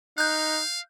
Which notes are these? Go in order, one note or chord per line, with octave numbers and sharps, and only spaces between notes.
D#4 F5 F#6 G6